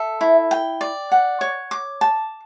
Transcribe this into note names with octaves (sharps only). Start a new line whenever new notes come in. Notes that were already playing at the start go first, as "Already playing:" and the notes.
Already playing: A4 E5
E4
G5
D5
F#5
C#5
D6
A5